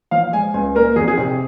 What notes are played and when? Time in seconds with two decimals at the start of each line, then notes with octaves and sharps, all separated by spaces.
0.11 F3 F5
0.33 G#3 G#5
0.54 C#2 G#5
0.75 A#3 A#4
0.96 F2 G#4
1.08 G#4
1.17 C3 G4